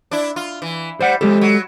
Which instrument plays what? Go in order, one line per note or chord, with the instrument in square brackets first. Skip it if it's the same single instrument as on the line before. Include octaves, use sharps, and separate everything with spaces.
[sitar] D4 E4
F4
E3
[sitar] G3 [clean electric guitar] C5 F#5
[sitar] F2 [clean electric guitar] G#3 G4 A4
[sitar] F#3